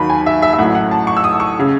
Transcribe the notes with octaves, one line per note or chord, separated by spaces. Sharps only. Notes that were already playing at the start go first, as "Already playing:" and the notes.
Already playing: D#2 D#3 F#3 B5
G#5
E5
E5
E5
A1 A2 F#3 F#5
F#5
A5
C#6
E6
D#6
C#6
C#3